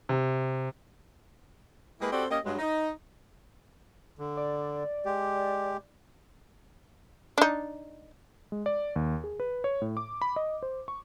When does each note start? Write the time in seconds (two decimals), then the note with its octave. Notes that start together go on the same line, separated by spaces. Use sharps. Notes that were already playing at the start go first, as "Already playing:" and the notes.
0.09 C3
2.00 G#3 A#3 E4 G4 G#4 B4
2.11 C4 F#4 G4 A4 C5 D5
2.29 A#3 C#4 G4 D#5
2.45 G2 F#3 G#3
2.58 D#4
4.19 D3
4.37 D5
5.05 G#3 G4
7.38 D4 D#4
8.52 G#3
8.66 D5
8.96 D#2
9.24 G#4
9.40 B4
9.64 C#5
9.82 A2
9.97 D6
10.22 B5
10.36 D#5
10.63 C5
10.88 C#6